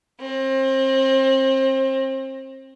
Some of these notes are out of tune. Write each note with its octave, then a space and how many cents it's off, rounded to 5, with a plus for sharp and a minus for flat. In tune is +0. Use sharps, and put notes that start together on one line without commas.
C4 +30